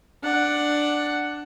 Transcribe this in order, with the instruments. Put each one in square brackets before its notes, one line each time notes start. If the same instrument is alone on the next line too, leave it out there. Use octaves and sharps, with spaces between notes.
[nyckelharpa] D4 F#5